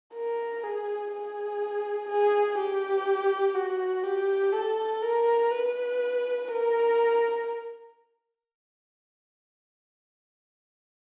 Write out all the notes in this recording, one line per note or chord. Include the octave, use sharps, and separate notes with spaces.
A#4
G#4
G#4
G#4
G4
F#4
G4
A4
A#4
B4
A#4